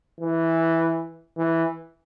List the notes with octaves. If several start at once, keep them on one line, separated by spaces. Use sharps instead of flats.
E3
E3